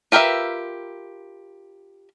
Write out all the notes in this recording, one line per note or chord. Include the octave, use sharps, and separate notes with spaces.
F4 G4 A#4 B4 E5